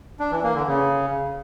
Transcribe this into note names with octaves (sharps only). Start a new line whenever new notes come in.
D4
E3
A#3
D3
C#3